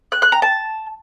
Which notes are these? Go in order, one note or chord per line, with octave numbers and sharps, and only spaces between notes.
F#6
F#6
A#5
A5